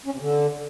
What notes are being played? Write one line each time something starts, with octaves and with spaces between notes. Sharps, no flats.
C#4
C3
D3